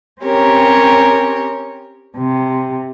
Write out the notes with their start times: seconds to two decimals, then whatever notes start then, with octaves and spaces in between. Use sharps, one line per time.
0.22 C4 C#4 G4 A#4 C#5
2.17 C3